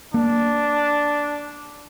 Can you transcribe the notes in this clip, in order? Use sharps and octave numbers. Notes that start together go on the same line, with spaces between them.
A#3 D4